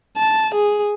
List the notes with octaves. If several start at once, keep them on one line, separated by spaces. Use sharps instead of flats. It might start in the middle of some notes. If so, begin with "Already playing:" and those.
A5
G#4